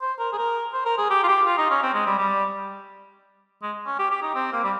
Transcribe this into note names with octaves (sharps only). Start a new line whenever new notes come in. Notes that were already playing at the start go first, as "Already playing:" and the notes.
C5
A#4
G#4
A#4
C5
A#4
G#4
G4
F4
G4
F4
D#4
C#4
C4
G#3
G3
G3
G#3
C#4
G4
G4
D#4
C4
A#3
G3